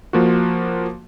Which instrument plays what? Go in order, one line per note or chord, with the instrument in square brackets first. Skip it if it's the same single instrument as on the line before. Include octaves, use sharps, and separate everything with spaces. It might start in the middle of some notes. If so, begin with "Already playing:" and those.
[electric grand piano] F3 A#3 F4 F#4